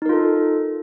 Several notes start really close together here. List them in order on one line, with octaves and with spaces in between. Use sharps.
D#4 A#4 F4 A4